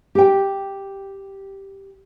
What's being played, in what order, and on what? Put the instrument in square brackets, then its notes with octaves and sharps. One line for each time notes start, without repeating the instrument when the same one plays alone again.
[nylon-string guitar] G4 G5